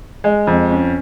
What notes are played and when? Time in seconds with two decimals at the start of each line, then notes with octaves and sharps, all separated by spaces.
0.24 G#3
0.47 F2
0.71 C#4